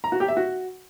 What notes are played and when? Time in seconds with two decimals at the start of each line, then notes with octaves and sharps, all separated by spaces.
0.04 A#5
0.12 F#4
0.20 G4
0.28 E5
0.37 F#4